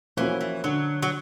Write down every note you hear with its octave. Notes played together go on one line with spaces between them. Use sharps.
E3 F3 A#3 C#4 F#4
E3
D3 F#3
F#3